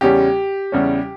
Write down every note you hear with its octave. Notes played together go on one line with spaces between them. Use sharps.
E2 C#3 G3 C#4 G4
E2 C#3 G3 C#4